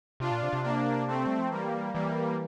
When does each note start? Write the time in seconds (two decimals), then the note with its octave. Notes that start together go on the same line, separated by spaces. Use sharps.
0.20 C3 D4 F4
0.31 A#2
0.43 C3
0.53 C3
0.64 A#3 D4
1.08 A3 C4
1.26 G3
1.39 F3
1.51 E3 G3 A#3
1.95 E3 G3 A#3